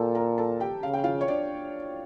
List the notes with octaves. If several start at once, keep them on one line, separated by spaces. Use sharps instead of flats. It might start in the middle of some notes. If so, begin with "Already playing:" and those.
Already playing: A#2 A4 G5 A5
A#4 A#5
A4 A5
G4 G5
C#3 F5
G5
F4 F5
C#5
D4 D5